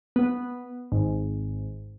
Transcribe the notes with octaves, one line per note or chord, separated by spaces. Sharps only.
B3
G#1